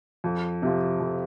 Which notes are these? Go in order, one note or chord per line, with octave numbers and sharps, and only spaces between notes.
F2
C3 F3
F2